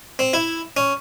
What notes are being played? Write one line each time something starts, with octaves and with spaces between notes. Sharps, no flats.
C4
E4
C#4